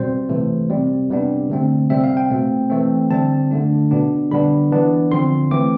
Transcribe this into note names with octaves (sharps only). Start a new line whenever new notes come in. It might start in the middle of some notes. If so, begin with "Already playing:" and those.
Already playing: B2 G3 C4 C5
C3 E3 A3
C3 G3 C4
C3 G3 B3 D4
D3 A3 C4
C3 G3 C4 E5
F5
G5
B2 A3 C4
E3 A3 C4
D3 G3 C4 A5
D3 A3 D4
B2 B3 D4
D3 G3 B3 D4 B5
E3 B3 D4
D3 F3 C4 C6
E3 A3 C4 D6